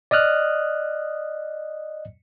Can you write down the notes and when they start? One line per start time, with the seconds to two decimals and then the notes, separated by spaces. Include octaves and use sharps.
0.11 D5 D#5 D#6 F6 F#6